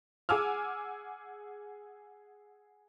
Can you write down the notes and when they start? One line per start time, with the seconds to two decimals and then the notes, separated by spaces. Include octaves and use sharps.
0.29 G#4 F#5 G#5 D6 E6 F6